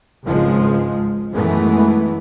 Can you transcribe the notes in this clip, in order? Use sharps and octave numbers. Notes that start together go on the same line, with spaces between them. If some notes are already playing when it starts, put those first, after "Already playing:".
G#1 C#2 G#2 F3 G#3
F#2 D#3 E3 G#3 A3 B3